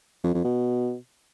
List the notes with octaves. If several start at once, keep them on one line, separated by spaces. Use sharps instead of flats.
F2
F2
B2